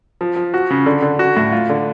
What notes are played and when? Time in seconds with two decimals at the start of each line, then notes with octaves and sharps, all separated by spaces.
0.21 F3
0.36 F3
0.54 F#4
0.70 C#3
0.86 D3
1.02 D3
1.19 F#4
1.37 A2
1.52 F4
1.69 D3